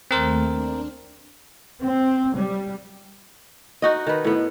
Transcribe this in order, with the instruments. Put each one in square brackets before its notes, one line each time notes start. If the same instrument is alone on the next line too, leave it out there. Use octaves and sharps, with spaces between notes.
[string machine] D#2 A3 [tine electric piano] C4 A#4 C5
[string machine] D4
[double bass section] C4
G3
[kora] D#4 F#4 D#5
D#3 B4
A2 B3